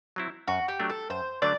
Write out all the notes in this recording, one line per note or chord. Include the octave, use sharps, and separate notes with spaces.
F#3 C4 E4
F#2 F#4
G4
F#3 A3 D4
A4
F#2 C5
D3 F#3 A3 D4 D5